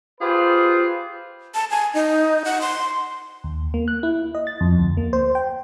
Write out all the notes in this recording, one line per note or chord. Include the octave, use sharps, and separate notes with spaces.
F4 G4 G#4 B4 C5
A5
G#5
D#4
F#5
C6
D#2
A#3
F#6
E4
D#5
A6
F2
D2
A#3
C5
G5